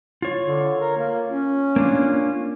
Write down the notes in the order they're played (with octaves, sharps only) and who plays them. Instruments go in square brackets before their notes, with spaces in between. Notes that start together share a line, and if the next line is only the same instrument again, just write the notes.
[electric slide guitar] F4 C#5
[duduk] D3
A#4
A#3
C#4
[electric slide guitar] A#3 D4 F4